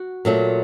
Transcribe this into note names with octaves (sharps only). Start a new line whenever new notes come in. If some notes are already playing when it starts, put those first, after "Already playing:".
Already playing: F#4
A#2 F#3 A3